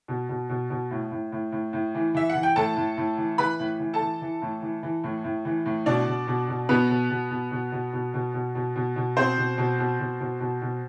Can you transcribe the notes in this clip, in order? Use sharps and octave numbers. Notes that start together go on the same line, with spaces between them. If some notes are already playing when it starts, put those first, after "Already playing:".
B2
B2
B2
B2
A2
A2
A2
A2
A2
E3
E3 E5
F#5
E3
G5
A2 A4 A5
A2
A2
E3
E3 B4 B5
A2
E3
A4 A5
E3
E3
A2
E3
E3
A2
A2
E3
A2
B2 D4 D5
B2
B2
B2
B2 B3 B4
B2
B2
B2
B2
B2
B2
B2
B2
B2
B2
B2
B2 C4 C5
B2
B2
B2
B2
B2
B2
B2